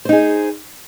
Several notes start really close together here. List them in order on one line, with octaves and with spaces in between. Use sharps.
C5 D#4 G#4